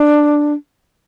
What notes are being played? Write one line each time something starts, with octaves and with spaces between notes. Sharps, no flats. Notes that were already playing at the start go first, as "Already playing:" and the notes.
Already playing: D4